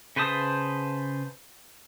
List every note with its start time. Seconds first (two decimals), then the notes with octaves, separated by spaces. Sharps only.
0.16 C#3 B4 C5 A5 D#6